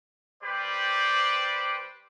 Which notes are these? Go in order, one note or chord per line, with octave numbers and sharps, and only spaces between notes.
G3 G4 B4 C5 D5